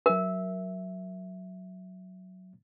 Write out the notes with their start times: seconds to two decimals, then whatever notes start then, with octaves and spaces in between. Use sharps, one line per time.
0.06 F#3 A#4 E5